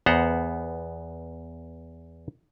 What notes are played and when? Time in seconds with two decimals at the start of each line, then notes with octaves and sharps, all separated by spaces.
0.06 E2 B3 C5 F#5 A#5